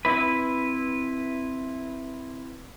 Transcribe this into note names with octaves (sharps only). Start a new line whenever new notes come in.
C4 E4 B4